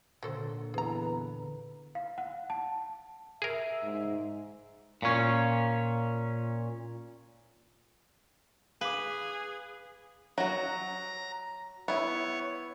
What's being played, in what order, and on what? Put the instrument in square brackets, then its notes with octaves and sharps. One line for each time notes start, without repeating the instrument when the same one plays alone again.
[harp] A#2 D3 [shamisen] F#3 A4 C5
[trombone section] E2 B4 [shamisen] G#4 A#5
[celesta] F5
F#5
A5
[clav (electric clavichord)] G#4 A#4 [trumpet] E5
[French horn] G#2
[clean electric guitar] A#2 C#4
[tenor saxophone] G#4 [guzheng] B4 [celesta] F5 D6
[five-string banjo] F#3 F#4 [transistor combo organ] A#5
[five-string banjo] B3 E4 [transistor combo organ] C#5